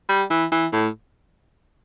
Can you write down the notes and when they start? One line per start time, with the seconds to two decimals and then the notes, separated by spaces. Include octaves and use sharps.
0.09 G3
0.30 E3
0.52 E3
0.73 A2